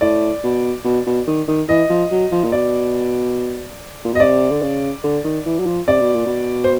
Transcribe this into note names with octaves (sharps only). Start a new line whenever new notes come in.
A2 D5
B2
B2
B2
D#3
D#3
E3 D#5
F3
F#3
F3
A#2
B2 D5
A#2
B2
D#5
C3 D5
D3
C#3
D3
D#3
E3
F#3
F3
C3 D5
B2
A#2
B2
C5